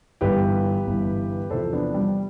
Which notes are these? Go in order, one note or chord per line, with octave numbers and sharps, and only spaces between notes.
G1 G2 E3 G4 B4
G1 G2 E3
E2 C3 F3 A4 C5
B3 D4
G3